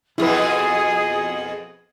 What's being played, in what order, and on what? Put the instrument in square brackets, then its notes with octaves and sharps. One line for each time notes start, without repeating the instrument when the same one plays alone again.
[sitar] F2 B2 C4 [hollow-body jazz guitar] E4 B4 [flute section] G#4